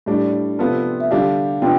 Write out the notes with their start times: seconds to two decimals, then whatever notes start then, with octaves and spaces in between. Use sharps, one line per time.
0.06 A2 G3 D4 D5
0.59 C3 F3 B3 F4 A4
1.00 E5
1.10 D3 G3 D4 G4 F5
1.62 C3 F3 B3 D4 F4 G5